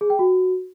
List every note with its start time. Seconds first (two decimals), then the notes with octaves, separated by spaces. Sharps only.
0.01 G#4
0.10 G5
0.19 F#4